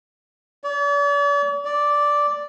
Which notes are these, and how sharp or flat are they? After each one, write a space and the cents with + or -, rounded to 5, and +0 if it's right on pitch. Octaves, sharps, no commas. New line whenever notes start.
D5 -45
D5 -5